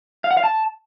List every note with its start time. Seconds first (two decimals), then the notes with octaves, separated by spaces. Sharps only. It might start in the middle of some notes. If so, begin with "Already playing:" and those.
0.24 F5
0.31 F#5
0.37 F5
0.44 A5